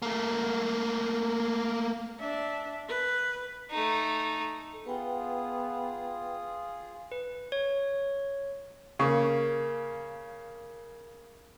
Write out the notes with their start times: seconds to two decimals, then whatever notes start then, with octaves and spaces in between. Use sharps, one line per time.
0.02 A3 A#3
2.20 D4 E5
2.88 B4
3.70 A3 D#4
4.86 B3 F4 G#4 B4 G5
7.12 B4
7.52 C#5
8.99 C#3 A#3